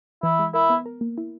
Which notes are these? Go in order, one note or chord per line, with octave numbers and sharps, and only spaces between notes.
E3 E4
G#3
E4 A#4
B3
A#4
A#3
E4